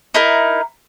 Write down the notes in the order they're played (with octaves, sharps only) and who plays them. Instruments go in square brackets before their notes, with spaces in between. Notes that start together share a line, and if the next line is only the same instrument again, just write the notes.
[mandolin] D#4 E4 A#4